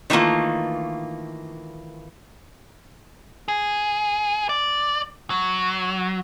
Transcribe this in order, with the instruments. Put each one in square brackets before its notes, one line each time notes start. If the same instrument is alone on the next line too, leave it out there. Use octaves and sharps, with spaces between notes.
[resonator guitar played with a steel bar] D#3 E3 A3 A#3 F4
[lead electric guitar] G#4
D5
F#3